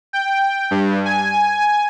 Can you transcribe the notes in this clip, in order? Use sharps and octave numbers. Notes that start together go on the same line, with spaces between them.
G5
G2
G#5